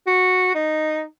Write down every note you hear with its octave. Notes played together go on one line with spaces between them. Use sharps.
F#4
D#4